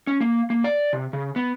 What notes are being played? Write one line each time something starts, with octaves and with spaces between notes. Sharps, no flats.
C#4
A#3
A#3
D5
C3
C#3
B3